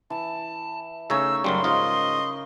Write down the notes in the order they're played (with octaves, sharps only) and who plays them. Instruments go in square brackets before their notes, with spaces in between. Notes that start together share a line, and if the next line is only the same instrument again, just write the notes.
[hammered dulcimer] E3 [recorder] A5
[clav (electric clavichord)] C#3 G#5 A#5 [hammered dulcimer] A3 D#4 C#5 [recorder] E6
[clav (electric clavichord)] F#2 F#3 G3 [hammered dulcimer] C#3 A#4 B5 [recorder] C6
[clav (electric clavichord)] G#2 F4 [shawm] D#5